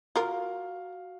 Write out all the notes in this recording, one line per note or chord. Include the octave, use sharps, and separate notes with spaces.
F4 F#4 A#4 F5